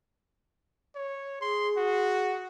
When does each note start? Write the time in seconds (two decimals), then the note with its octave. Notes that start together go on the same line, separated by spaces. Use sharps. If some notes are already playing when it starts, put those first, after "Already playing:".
0.95 C#5
1.41 G#4 C6
1.77 F#4